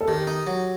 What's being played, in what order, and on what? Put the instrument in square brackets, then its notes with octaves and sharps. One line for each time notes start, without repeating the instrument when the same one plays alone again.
[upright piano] A4
[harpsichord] D#3 [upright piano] G4
[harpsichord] D#4
F#3